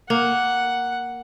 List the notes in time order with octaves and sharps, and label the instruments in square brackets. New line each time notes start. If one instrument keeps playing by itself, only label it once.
[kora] A#3 [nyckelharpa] F#5